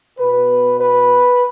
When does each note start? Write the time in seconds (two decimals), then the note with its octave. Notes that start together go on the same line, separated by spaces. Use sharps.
0.18 B2 B3 B4
0.79 B4